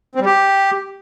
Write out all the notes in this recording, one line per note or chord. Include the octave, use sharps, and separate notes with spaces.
C4
G3
G4